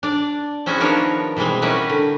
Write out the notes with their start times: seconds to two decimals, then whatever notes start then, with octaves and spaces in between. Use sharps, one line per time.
0.03 D4 D5
0.66 C4 C#4 E4 F#4 G#4
0.80 D#3 F3 B3 D4 A#4 C#5
1.37 B2 E3 G3 G#3 C4
1.62 G3 C#4 E4 F#4 A#4 B4
1.90 D3